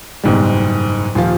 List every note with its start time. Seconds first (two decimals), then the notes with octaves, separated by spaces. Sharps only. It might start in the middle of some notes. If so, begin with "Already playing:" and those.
0.24 F#1 G#2 B2 G3
1.15 D#1 F3 F5